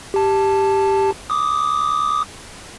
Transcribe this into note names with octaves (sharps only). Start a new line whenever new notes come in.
G4 A5
D6 D#6